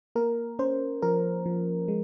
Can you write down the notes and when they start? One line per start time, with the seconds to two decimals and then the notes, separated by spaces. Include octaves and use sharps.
0.15 A#3 A#4
0.59 C#4 C5
1.02 F3 A#4
1.46 F3
1.88 G#3